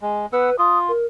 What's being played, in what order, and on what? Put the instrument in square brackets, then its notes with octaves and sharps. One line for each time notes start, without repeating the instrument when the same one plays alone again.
[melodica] G#3
[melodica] B3 F#5 E6 [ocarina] B4
[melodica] F4 [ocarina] D#6
[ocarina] A#4